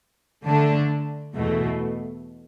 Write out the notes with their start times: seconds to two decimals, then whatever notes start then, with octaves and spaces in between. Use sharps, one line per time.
0.45 D3 A3 D4
1.33 E2 B2 A3